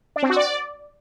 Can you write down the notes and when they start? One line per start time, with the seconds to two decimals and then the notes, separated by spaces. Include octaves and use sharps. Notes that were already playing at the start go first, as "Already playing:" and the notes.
0.16 D4
0.23 C4
0.30 F#4
0.36 D5